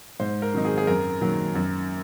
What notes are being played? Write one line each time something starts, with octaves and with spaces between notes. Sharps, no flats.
G#2 C5
A#4
D#3 F#3 C4 D#4
G#4
G#4
F#2 A#4
D#3 F#3 A#3
F#2